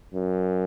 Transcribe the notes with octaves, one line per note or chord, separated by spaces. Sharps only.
F#2